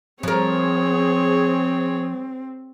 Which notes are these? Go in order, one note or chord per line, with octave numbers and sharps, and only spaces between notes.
F3 C4 G#4 A#4 C#5